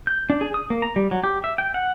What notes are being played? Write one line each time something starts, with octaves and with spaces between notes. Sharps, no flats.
G6
D4
G#4
D#6
A#3
A#5
G3
F#3
G4
E5
G5
F#5